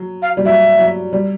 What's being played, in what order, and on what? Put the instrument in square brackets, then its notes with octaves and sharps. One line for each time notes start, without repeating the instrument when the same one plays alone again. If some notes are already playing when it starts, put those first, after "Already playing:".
Already playing: [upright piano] F#3
[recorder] F5
[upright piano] G3
[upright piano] F#3 [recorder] E5
[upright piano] F#3
G3